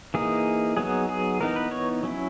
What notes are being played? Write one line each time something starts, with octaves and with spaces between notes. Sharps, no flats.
E3 A#3 D#4 G#4
F#3 B3 D#4 G#4
G#4
E3 B3 D#4 A#4
B4
C#5
F#3 C#4 E4